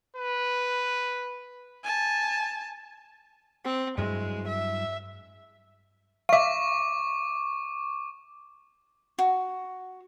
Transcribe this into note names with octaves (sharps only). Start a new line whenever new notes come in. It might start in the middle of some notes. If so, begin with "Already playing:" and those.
B4
G#5 A5
C4
G2 F#3 G#3 E4
E5
E5 F5 C#6 D6
F#4